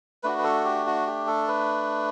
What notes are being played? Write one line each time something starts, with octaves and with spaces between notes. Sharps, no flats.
A3 D4 F#4 B4
B4
A4
G4
F#4
G4
A4
B4